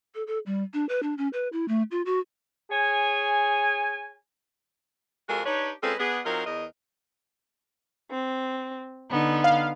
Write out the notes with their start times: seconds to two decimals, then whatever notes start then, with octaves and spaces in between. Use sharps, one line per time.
0.15 A4
0.27 A4
0.46 G3
0.74 D4
0.89 B4
1.03 D4
1.18 C#4
1.33 B4
1.53 E4
1.68 A3
1.91 F4
2.06 F#4
2.71 G#4 C#5 G#5
5.29 F2 G#3 F4 F#4 A4 A#4
5.46 D4 D#4 G4 B4 C#5
5.83 G#3 C4 C#4 F4 A4 B4
6.00 B3 D4 G#4
6.25 F#3 C4 D#4 F4 A#4
6.47 E2 A#4 D#5
8.10 C4
9.12 D3 B3 D#4
9.44 F5